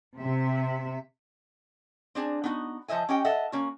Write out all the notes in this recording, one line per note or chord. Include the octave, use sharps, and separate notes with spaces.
C3 E5
C4 D4 G#4
B3 D#4 F4 F#4
F3 C5 D#5 E5 G#5
C#4 G4 D#5 G5
A4 D#5 E5 F#5
A#3 C#4 F#4